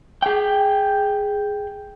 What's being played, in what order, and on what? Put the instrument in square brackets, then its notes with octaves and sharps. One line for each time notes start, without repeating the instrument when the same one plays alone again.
[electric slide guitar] G#4 G5